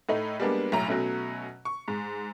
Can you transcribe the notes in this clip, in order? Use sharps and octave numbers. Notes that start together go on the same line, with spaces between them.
A2 A3 D#4
G3 G#3 A#3 B3 D4
B1 A2 E4 A#5
B2 F#3 A3 C#4
C#6
G#2